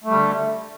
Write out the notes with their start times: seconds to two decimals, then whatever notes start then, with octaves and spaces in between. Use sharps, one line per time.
0.04 A3
0.08 G3
0.12 D3